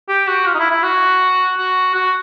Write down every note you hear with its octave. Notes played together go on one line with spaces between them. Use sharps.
G4
F#4
F4
D#4
E4
E4
F#4
F#4
F#4